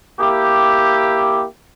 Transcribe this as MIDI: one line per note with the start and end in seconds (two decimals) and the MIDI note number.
0.19 1.45 58
0.19 1.45 64
0.19 1.45 67